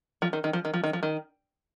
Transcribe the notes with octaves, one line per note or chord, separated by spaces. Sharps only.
F3
D#3
D#3
F3
D#3
F3
D#3
F3
D#3